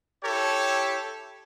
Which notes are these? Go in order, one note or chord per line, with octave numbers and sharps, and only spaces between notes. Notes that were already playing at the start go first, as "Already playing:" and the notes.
E4 G4 A4 C#5